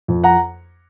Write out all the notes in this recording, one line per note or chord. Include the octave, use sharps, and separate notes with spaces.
F2
F#5 A#5